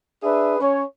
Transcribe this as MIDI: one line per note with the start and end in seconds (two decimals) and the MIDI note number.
0.23 0.55 62
0.23 0.55 68
0.23 0.55 71
0.23 0.55 76
0.60 0.84 61
0.60 0.84 73